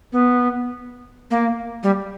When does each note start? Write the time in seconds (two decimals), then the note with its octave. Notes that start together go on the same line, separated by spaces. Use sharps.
0.13 B3
1.31 A#3
1.83 G3